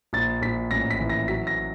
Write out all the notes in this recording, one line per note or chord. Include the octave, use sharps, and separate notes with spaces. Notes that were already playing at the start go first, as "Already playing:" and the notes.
A#1 A6
A#1 B6
A1 A#6
B6
E3
A#6
F#3 B6
A#6